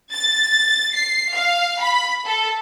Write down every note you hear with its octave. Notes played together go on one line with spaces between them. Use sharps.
A6
C7
F5
B5
A4